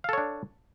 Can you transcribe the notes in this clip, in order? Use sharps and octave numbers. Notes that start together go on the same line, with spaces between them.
D4 A4 C#5 F5